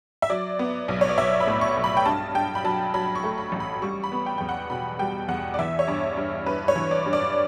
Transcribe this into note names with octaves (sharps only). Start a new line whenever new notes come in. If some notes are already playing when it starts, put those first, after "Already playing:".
E5
F#3 D5
B3
B1
C#5
D5
B1 E5
B5
A2
C#6
B1
B5
G5
G2 A5
G2 G5
B5
F#3 A5
F#3 B5
C#6
A3
B5
A1
B5
G3 C#6
B5
B3
G5
E2 G5
F#5
B2 B5
G3 G5
E2 F#5
D5
E3 E5
C#5
G2 D5
G2
G2 B4
C#5
E3
D5
G2
D5